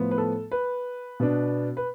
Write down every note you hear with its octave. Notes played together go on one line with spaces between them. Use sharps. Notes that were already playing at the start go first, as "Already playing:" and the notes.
Already playing: A2 F3 B3
B4
A4
B4
B2 B3 D4
B4